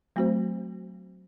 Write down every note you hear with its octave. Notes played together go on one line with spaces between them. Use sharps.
F#3 A3 C4 F#4 C5